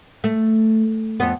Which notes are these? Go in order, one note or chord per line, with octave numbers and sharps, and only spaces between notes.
A3
F2 B3